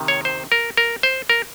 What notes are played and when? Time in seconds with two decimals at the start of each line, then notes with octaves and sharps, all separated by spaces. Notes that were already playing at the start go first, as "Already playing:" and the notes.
Already playing: C3 D#3
0.08 C#5
0.25 C5
0.52 A#4
0.77 A#4
1.03 C5
1.30 A#4